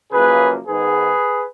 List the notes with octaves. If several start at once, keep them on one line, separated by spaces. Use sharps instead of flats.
F#2 C#3 F3 A#3 G#4 B4
G#2 D#3 G#3 B3 G#4 B4